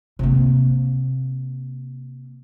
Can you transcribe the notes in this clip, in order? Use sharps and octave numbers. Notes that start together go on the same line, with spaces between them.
C3 A#3